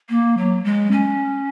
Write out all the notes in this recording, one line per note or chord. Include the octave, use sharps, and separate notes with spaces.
A#3
F#3
G#3
C#4